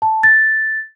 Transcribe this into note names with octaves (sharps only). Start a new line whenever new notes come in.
A5
A6